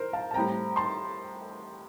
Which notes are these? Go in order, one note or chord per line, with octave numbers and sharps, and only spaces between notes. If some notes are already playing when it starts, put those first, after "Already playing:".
Already playing: E3 A#4 C5
F5 A5
A5
A2 G3 C4 G5 A#5
A5 C6